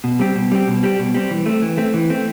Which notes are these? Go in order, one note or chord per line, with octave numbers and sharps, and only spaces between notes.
B2
G3 C4 G4
B2
G3 C4 G4
B2
G3 C4 G4
B2
G3 C4 G4
E3
A3 C4
E3
A3 C4
E3
A3 C4